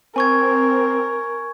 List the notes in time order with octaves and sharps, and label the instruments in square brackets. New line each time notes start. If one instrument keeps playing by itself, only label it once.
[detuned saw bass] C4 [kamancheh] A#4 [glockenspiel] G#5 C#6 G#6